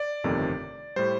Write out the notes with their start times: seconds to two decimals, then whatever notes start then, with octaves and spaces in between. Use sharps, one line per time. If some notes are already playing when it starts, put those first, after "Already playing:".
Already playing: D5
0.24 G1 F2 C3 D#3 A3
0.96 A2 G3 C5